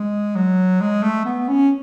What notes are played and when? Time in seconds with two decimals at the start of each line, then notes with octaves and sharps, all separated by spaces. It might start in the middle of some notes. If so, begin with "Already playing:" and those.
Already playing: G#3
0.35 F#3
0.81 G#3
1.03 A3
1.25 B3
1.48 C#4